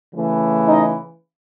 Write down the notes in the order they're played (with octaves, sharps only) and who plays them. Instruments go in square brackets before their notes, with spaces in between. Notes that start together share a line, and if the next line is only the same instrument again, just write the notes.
[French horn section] C#3 E3 A3
D#4 D#5